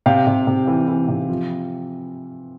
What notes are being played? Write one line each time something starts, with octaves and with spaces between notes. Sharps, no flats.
C3 F5 G5
C3
C3
E3
E3
C3
F3